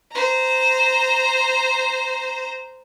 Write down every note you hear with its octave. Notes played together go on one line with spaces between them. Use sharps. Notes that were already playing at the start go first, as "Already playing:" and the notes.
C5 A#5